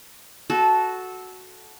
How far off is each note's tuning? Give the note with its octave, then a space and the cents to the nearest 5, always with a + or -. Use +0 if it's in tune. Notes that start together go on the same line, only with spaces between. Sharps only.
F#4 +0 A4 -15